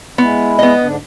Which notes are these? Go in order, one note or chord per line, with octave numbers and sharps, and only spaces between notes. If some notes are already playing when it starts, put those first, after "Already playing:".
G#3 B3 E4
B3 D#5
G#2 D3 D4